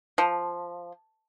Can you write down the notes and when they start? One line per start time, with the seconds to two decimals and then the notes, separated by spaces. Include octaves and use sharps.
0.18 F3